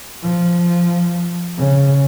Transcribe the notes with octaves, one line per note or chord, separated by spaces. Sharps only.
F3
C#3